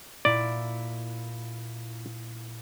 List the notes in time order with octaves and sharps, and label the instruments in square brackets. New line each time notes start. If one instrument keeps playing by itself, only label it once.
[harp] A#2 E4 [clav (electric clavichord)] D5